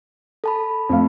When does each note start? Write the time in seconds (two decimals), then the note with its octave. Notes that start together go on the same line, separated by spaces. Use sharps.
0.44 A4 A5 B5
0.89 F2 A3 F5